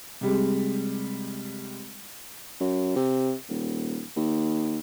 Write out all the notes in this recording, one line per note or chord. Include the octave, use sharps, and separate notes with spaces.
C3 G3 G#3
F#2
C3
D#1
D#2